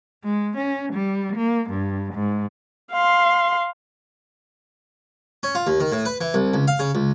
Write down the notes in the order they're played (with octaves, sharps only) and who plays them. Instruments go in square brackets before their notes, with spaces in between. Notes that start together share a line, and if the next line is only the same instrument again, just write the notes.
[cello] G#3
C#4
G3
A#3
G2
G#2
[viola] F5 C6
[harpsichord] C#4
F4
D#2
D#3
A2
B4
E3
C2
C#2
F5
C#3
C#2